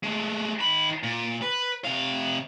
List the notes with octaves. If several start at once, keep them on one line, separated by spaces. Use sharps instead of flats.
G#3 A3
D#3 B5
A#2
B4
C3 F5